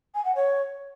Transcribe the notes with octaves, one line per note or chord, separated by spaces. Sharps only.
G#5
F#5
C#5